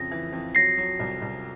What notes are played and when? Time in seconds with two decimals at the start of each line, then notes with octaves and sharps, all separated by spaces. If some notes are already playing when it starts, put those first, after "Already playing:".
Already playing: F2 C#3 A#6
0.11 E3
0.33 F2
0.55 F#3 A#6 C7
0.78 F#3
0.99 C2
1.22 C2